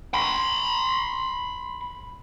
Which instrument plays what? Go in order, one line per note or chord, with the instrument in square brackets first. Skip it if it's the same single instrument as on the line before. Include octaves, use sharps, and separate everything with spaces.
[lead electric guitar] B5 C6